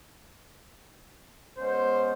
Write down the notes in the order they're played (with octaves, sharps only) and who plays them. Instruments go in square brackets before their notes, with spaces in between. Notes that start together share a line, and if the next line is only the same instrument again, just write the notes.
[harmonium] G#3 B3 C#4 [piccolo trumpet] C5